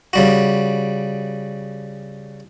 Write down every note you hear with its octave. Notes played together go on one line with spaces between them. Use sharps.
C#3 G3 F#4